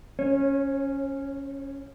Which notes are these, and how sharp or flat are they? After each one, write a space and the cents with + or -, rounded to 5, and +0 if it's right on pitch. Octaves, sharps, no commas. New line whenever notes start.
C#4 +0 C#5 -30